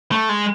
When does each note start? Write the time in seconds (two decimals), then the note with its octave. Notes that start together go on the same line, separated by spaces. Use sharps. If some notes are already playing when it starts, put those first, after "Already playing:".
0.12 A3
0.29 G#3